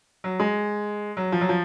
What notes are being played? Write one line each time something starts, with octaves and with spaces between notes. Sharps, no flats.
F#3
G#3
F#3
F3
F#3
F3